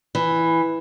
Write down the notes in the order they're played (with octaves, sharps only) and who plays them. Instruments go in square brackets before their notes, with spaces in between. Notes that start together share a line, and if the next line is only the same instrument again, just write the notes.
[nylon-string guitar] E3